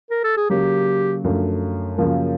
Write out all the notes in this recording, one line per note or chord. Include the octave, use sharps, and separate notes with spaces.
A#4
A4
G#4
C#3 F#3 A#3 G4
F#2 D3 F3 A3
F#2 C#3 F3 A#3